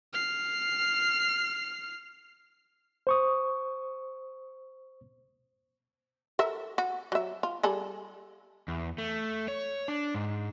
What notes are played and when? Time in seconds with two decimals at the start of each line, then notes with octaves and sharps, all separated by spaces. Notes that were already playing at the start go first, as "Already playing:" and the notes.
0.13 F6 C7
3.07 C5 C#6 D#6
6.39 A4 A#4 E5
6.78 F#4
7.12 F#3 E5
7.43 F4
7.63 G3 G#4 A4
8.68 E2
8.98 A3
9.48 C#5
9.88 D4
10.15 G#2